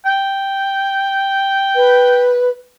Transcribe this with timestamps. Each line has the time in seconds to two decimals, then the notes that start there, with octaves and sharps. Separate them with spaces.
0.06 G5
1.75 B4